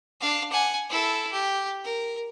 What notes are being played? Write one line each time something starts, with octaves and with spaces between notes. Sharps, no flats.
D4 F5
F#5 G#5
E4 A4
G4
A#4